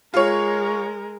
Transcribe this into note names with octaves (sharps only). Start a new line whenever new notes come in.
G#3 F4 A#4 C#5